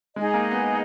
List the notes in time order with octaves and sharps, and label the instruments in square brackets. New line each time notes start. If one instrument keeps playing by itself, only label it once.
[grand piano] G#3 [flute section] D#4 G#4 D#5
[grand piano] A#3
B3